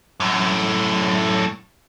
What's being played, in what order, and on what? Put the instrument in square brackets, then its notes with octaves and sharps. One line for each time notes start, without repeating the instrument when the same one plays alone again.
[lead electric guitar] F#2 A2